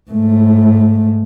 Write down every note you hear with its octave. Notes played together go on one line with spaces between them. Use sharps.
G#2 A3